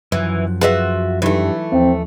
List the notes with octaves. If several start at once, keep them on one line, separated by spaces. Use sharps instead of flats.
F#2 E3 F3
F4 F#4 G#4 B4 E5
G2 E3 F#3 A3 D#4
D#2 F3 C4